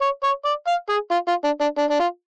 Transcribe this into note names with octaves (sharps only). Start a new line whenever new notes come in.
C#5
C#5
D5
F5
G#4
F4
F4
D4
D4
D4
D4
F4